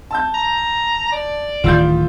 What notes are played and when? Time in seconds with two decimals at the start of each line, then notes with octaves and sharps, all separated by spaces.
0.11 A5 E6 G6
0.34 A#5
1.12 D5
1.64 D1 D#3 E3 F4 E6 G6